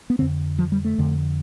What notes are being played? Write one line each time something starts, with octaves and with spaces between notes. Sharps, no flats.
B3
F2 D3 C4
F3
G3
A3
F2 D3